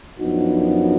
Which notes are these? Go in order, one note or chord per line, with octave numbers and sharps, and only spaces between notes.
F#2 F3 B3 D4 D#4 F#4